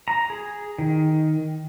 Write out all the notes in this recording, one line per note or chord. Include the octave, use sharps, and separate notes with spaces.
A#5
G#4
D#3